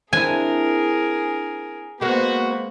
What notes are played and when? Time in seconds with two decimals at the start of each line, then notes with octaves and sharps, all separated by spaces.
0.13 C4 D4 E4 G#4 A#4 G#5
2.01 G#3 A#3 B3 F#4 C5